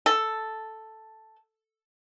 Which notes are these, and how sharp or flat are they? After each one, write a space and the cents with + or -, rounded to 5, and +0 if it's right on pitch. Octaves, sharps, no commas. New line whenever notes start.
A4 +0